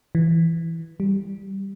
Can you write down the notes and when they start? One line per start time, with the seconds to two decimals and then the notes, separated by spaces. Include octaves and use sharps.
0.15 E3
1.00 G3